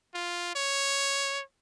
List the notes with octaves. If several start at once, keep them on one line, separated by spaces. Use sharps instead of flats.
F4
C#5